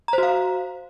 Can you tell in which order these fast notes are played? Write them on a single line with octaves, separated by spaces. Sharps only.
A#5 C5 F#4 F5